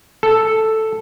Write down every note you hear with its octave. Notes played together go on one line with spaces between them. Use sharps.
A4